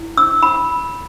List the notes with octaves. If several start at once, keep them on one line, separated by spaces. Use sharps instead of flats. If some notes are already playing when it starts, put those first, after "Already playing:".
Already playing: E4
E6
B5